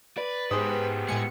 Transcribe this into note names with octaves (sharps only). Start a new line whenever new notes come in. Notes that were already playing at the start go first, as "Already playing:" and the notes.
B4 D5
G#2 B3 G4 G#4 C5 D#6
A2 G#3 G#5 C#7